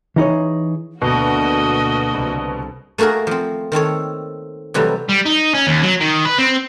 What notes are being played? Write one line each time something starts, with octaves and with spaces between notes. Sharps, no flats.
E3 D#4 G#4 C#5
D2 B2 A#3 F#4 D#5
C2
A3 A#3 F#4 G#4 A#4
F3 C4
D#3 C4 A4 C#5
C3 E3 F#3 G3 A3
G3
D#4
C#4
D#2
F#3
D#3
B4
C4